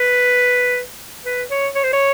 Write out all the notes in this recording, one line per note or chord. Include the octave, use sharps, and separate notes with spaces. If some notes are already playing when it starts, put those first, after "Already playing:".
Already playing: B4
B4
C#5
C#5
C5
C#5